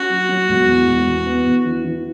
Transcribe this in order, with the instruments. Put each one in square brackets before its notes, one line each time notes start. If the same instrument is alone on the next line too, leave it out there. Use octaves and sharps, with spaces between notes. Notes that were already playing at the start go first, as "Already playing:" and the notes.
Already playing: [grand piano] C#4 [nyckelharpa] F#4
[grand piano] F#3
F#3
E1
E2
E1
E2
B3
E2
E3
E3